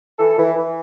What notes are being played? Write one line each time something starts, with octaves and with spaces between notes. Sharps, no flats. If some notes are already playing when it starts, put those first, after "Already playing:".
E3 A4
E3
E3